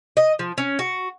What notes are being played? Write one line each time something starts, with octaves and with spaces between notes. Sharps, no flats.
D#5
F3
C#4
F#4